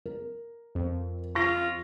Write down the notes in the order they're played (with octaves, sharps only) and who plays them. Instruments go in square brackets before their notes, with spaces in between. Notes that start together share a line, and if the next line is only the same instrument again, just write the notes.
[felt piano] A#4
[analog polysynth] F2
[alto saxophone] F4 [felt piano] C#6 A#6